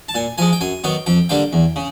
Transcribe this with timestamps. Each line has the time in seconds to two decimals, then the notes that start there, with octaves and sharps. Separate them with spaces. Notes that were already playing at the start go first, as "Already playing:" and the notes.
0.09 A5
0.15 A#2 G#5
0.38 F3 G#3 G#5
0.53 G5
0.61 F#2 G#5
0.84 D#3 F#3 B3 G5
1.06 F2 G5
1.29 D3 G3 A#3 G5
1.53 E2
1.76 C#3